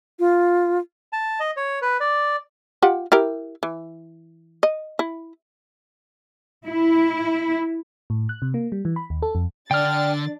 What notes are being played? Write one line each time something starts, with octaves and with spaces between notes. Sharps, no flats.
F4
A5
D#5
C#5
B4
D5
F4 G4 F#5
E4 G4 A#4
E3
D#5
E4
E4
A2
F#6
C3
A#3
G3
E3
B5
D#2
A4
F2
D3 D4 G5 F6 A6